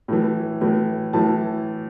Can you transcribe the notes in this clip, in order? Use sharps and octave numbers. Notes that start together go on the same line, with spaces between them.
A2 E3
A2 E3
A2 E3 A5